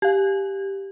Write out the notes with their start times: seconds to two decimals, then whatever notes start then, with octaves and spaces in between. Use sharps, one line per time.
0.02 G4 F5